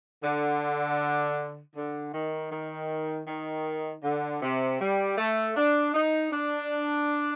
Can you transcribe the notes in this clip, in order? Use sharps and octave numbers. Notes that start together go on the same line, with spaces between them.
D3
D3
D#3
D#3
D#3
D3
C3
G3
A3
D4
D#4
D4